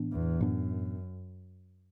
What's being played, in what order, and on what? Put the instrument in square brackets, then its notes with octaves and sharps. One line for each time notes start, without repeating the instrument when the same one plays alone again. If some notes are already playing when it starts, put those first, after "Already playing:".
Already playing: [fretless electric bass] A2 E3 B3 D4
[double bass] E2
[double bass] F#2 [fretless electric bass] A2 E3 B3 D4